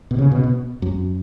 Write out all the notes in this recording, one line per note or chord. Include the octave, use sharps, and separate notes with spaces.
B2
C#3
B2
B2
F#2